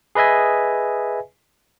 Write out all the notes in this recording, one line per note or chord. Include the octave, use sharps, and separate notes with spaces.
G#4 B4 D#5 E5 G#5